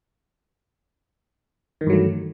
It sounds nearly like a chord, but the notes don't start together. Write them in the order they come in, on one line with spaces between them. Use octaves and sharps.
D#3 E3 G2 F#3 A3